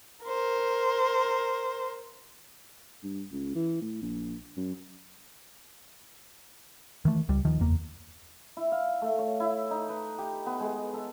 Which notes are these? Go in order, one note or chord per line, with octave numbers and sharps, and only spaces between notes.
A#4 C5
G2
C#2
E3
A2
A#1
F#2
D#3 E3 A3
C#2 G3
D#2 D#3 F3
F#1 E2 A#3
E4
F5
A3
C#5
E4
D#4
B4
G4
B3
G#3
A4